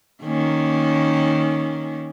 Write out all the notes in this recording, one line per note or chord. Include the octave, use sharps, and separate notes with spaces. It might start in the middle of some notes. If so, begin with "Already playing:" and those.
D#3 A#3 C#4